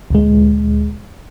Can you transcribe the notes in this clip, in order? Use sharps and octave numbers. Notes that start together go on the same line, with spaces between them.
D2 A#2 G#3